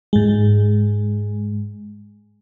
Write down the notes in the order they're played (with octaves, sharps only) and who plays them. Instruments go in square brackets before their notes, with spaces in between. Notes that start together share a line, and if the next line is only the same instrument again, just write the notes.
[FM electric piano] G#2 G#3